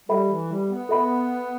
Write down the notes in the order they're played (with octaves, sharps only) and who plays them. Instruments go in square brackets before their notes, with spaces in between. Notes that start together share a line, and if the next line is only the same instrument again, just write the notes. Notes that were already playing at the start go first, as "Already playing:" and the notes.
[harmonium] G3 [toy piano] A4 E5 B5
[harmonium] E3
G3
B3
[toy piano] A4 E5 B5